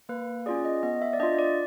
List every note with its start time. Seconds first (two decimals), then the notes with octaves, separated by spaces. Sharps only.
0.09 A#3 B4
0.46 C#4 F4 G#4 D5
0.65 D#5
0.83 B3 D#5
1.02 E5
1.13 D5
1.20 D4 F4 D#5
1.39 D5